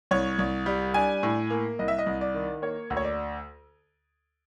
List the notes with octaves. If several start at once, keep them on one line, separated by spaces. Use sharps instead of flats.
C2 C#5
C2
G3
D4 G#5
A2
A#3
C2 D#5
E5
D#5
C2
D5
D#3
A#3 C#5
D2
C#5
D5